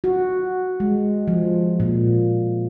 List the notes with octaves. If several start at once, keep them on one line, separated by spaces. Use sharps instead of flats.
F#4
G#3
F3
A#2